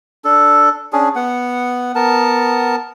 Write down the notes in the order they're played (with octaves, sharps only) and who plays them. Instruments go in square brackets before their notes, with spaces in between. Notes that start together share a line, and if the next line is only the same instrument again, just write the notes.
[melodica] D4 A4
C#4 D4 G#4
B3 F#5
B3 A#4 A5